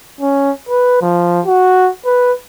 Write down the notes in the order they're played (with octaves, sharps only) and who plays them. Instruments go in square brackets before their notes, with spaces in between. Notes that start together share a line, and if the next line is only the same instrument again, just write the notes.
[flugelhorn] C#4
B4
F3
F#4
B4